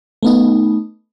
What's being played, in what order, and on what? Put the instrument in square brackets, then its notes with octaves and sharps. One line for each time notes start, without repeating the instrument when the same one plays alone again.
[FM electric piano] A3 B3 D#4